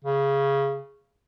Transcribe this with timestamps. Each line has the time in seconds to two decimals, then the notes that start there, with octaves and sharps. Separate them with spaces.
0.05 C#3